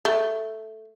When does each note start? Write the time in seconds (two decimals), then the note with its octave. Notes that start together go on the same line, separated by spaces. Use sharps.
0.05 A3